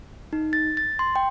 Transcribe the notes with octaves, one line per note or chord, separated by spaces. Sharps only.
D#4
A6
A6
C6
G5